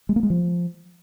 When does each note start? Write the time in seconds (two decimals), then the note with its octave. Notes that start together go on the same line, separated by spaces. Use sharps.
0.09 G#3
0.16 A#3
0.23 G#3
0.30 F3